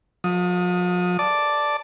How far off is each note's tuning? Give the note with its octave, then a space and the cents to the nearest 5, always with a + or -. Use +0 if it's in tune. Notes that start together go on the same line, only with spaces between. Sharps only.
F3 +40 D#6 +0
D5 +0 A5 +0 D6 +0